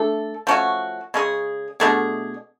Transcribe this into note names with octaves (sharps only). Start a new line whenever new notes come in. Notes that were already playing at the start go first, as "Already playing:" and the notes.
Already playing: A3 D4 A4
F3 A3 C#4 F#4
C#3 G#3 C#4 G#4
B2 A3 D4 G#4